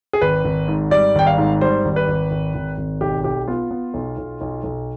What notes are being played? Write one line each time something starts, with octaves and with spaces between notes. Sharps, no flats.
G#4
G#1 B4
G#1
G#2
G3 D5
G#1 G5
F5
G#2
G3 C5
G#1
B4
G#1
G#1
G#1
G#1
B1 G4
B1 G4
B3 F4
B3
B1
B1
B1
B1